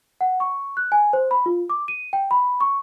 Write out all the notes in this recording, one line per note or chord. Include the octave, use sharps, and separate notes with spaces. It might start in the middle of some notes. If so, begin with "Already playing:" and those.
F#5
C#6
F#6
G#5
C5
B5
F4
D6
D#7
G5
B5
C#6